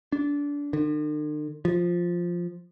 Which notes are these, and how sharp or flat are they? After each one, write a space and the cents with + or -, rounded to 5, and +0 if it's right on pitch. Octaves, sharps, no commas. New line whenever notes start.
D4 -25
D3 +45
F3 +0